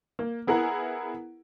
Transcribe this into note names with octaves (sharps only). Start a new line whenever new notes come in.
A#3
B3 E4 G#4 A#4 F#5 A#5